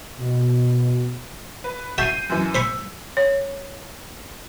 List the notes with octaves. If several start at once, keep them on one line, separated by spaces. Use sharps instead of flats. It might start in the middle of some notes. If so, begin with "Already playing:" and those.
B2
B4
F#4 E5 A5 G6 C7 D#7
F#2 E3
C5 B5 C#6 E6
C#5